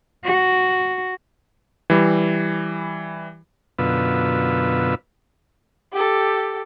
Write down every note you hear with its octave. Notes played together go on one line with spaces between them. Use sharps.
F#4
E3 G3
F#2 B2 D3 F4 B4 E6
G4 A4